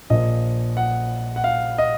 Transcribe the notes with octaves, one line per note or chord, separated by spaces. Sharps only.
A#1 A#2 F3 D#5
F#5
F#5
F5
D#5